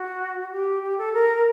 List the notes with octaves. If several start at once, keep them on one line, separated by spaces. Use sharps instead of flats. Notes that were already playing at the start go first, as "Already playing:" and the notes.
Already playing: F#4
G4
G4
A4
A#4